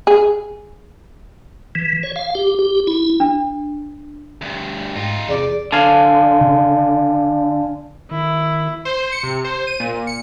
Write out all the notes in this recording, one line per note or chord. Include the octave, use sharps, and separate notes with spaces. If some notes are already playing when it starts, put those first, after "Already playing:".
G#4
E3
C#5
F5
G4
G4
E4
D4
D2 G2
G#2 D#4 F4 A4 G5
E2 C3 G#4 D5
D3 F5 G#5 A5
C#3
D#3 E4
C5
C#7
C3
C5
D#7
A#2
A#2
C#7